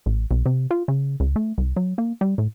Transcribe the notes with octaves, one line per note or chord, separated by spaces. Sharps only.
A1
B1
C3
F4
C#3
C#2
A3
C2
F#3
A#3
G3
A2